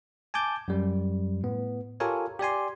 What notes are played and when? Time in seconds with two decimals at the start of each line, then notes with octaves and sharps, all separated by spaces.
0.34 G#5 A5 D6 G6
0.68 F#2 G3
1.43 A2 B3
2.00 F4 G4 A4 A#4 C#5 G#5
2.39 G4 D5 G#5 C6